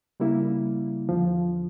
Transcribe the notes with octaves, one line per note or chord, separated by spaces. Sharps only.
C#3 G3 A#3 E4
E2 D3 F3